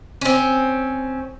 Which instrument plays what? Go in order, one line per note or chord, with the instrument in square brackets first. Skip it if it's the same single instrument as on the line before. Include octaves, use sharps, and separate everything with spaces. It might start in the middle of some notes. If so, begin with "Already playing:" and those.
[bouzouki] C4 C#4